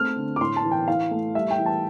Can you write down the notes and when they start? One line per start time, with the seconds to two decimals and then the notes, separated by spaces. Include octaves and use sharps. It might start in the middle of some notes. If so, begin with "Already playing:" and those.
Already playing: A3 C4 F6
0.16 D3
0.36 D6
0.41 A2 C6
0.56 A5
0.64 E3
0.71 G5
0.88 E4 F5
1.11 A3
1.34 G3 E5
1.51 G5
1.58 E3
1.66 A5